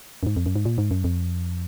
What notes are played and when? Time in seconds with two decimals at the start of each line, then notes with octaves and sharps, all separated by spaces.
0.23 F#2
0.27 G#2
0.37 F2
0.46 F#2
0.56 G#2
0.65 A#2
0.78 G#2
0.91 F#2
1.04 F2